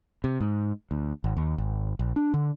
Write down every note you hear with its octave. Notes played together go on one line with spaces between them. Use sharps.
C3
G#2
D2
G#1
D#2
G#1
A#1
D4
D3